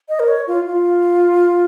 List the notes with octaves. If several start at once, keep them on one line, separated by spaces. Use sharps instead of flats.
D#5
A#4
C#5
F4
F4